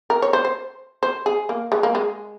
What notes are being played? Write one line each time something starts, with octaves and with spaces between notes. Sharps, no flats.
A#4
C#5
C5
C5
C5
G#4
A#3
G#3
A#3
G#3